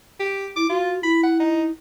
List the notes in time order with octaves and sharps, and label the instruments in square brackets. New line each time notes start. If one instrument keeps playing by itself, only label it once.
[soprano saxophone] G4
[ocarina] E4 [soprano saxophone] D6
[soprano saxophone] F4 [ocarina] F#4
[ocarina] E4 [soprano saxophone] B5
[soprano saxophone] F#5
D#4